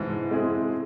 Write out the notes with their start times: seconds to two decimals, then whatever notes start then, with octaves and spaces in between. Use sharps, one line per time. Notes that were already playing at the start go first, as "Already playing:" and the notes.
Already playing: G#2 B2 D3 E3
0.31 G#3 C4 E4 G#4